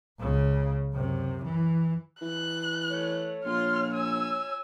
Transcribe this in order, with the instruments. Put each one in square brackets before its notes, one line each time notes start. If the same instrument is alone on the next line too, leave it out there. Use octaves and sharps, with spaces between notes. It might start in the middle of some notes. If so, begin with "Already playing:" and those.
[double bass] C#2 C#3
F#2 C3
E3
[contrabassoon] E3 [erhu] F#6
[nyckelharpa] A3 [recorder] C#5
[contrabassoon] A#1 [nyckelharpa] F4 C6 [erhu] F6
[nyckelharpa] G#5 [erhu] E6